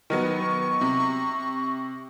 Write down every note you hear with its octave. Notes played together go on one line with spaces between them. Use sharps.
D#3 F#3 B3 C#6
C3